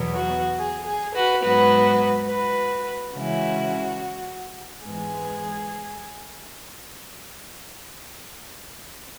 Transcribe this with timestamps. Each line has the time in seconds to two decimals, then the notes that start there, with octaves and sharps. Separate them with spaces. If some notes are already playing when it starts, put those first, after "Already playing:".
Already playing: E2 B2 F#3 B3
0.14 F#4
0.58 G#4
0.86 G#4
1.14 F#4 B4
1.42 G#2 F#3 B3 F#4 B4
2.28 F#4 B4
3.14 C#3 E3 G#3 C#4 E4 F#4
4.84 G#2 E3 G#3 B3 G#4